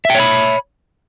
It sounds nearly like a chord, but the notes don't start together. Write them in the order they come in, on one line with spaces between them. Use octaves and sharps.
E5 G5 C#5 B5